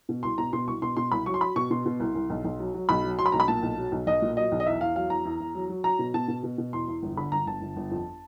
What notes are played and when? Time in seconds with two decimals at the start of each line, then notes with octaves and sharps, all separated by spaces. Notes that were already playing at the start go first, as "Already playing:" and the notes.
0.09 B2
0.23 C2 C6
0.38 B2 A#5
0.53 B2 C6
0.67 C2 C#6
0.82 B2 C6
0.97 B2 C6
1.12 C2 B5
1.26 F#3 C#6
1.34 C6
1.41 F#3 B5
1.56 B2 C#6
1.71 B2 C6
1.86 B2
2.00 C2
2.15 C2
2.30 B1
2.45 B1
2.59 F#3
2.74 F#3
2.89 B1 B5
3.03 F#3
3.19 F#3 C6
3.26 B5
3.32 B1 A#5
3.40 B5
3.48 A#2 A5
3.63 B1
3.78 F#3
3.92 B1
4.07 B1 D#5
4.22 A#2
4.37 F#3 D#5
4.52 B1
4.60 D#5
4.66 E2 E5
4.81 E2 F5
4.96 F#3 F5
5.10 E2 A#5
5.25 E2
5.40 E2
5.55 F#3
5.69 F#3
5.84 F#3 A#5
5.99 B2
6.14 B2 A5
6.28 B2
6.43 B2
6.58 B2
6.73 E2 C6
6.88 E2
7.03 G1
7.17 D3 B5
7.32 G1 A#5
7.47 G1 A5
7.62 G1
7.76 G1
7.91 F2